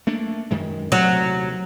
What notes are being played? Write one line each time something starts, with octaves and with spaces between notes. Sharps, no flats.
A3 A#3 D4
F#2 D#3 G#3
D#1 C3 F#3 A3